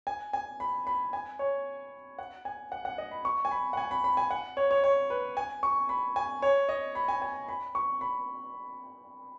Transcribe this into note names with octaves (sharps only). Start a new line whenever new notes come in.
G#5
G#5
B5
B5
G#5
C#5
F#5
G#5
F#5
F#5
D#5
B5
C#6
G#5
B5
F#5
G#5
B5
B5
G#5
F#5
C#5
C#5
C#5
B4
G#5
C#6
B5
G#5
C#5
D#5
B5
G#5
G#5
B5
C#6
B5